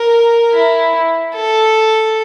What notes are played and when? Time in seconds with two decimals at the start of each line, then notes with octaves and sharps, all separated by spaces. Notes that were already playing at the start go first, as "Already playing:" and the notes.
Already playing: A#4
0.53 E4
1.35 A4